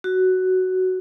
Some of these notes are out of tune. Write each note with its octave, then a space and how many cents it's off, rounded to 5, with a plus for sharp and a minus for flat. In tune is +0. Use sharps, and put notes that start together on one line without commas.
F#4 +10